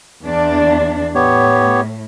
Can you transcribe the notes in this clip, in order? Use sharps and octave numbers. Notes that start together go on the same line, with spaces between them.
E2 D4
A2 B3 G4 C#5